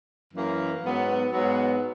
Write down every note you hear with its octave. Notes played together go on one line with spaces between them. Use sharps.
F#2 E3 A#3
G#2 F#3 B3
G#2 F#3 B3